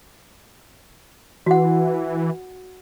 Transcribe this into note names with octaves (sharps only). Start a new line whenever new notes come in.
E3 F#4 F#5